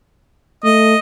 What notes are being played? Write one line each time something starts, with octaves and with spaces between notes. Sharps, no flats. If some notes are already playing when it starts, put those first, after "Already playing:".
A3 D#5